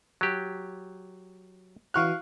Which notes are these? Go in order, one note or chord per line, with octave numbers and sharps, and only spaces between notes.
F#3 G4
E3 F#4 F5 C#6 F6 F#6